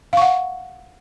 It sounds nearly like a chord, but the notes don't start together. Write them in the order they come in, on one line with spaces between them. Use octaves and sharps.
F5 C#6 F#5